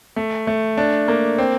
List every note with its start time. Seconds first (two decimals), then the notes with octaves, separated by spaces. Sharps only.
0.16 A3
0.47 A3
0.77 D4
1.08 A#3
1.38 C4